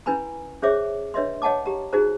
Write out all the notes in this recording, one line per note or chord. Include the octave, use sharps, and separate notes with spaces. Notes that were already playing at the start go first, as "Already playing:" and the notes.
C#4 E4 B4 G#5 A#5 B5
C#4 G#4 C5 C#5 E5 D6
D4 B4 C#5 D#5 E5 C6
C#5 D#5 F#5 G5 A5 D6
G4 A#5
D#4 F#4 G#4 C5 A#5